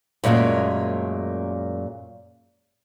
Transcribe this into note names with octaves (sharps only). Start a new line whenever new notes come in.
F#2 A#2 G#3 A3 C#4